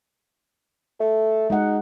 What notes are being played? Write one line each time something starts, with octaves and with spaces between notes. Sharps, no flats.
A3 A4
G#3 D#4 F#5